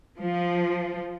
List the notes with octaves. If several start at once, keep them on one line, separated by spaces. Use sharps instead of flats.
F3